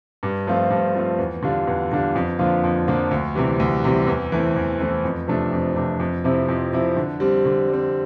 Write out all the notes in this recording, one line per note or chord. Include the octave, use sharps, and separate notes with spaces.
G2
F3 A3 C4 F4
G2
F3 A3 C4 F4
E2
D3 G3 D4 F4
E2
D3 G3 D4 F4
F2
D3 F3 A#3 F4
F2
D3 F3 A#3 F4
D2
C3 E3 G3
D2
C3 E3 G3
E2
E3 A3 C4
E2
E3 A3 C4
F2
C3 F3 A3 D4
F2
C3 F3 A3 D4
F2
C3 F3 C4 E4
F2
C3 F3 C4 E4
D3
G3 C4
D3
G3
C4